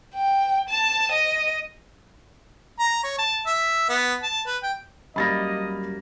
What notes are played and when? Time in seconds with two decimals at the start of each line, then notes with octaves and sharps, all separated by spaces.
0.15 G5
0.70 A5
1.12 D#5
2.79 A#5
3.04 C#5
3.18 A5
3.46 E5
3.89 B3
4.23 A5
4.46 B4
4.63 G5
5.16 F#2 G3 A#3 D#5 B5 A6 A#6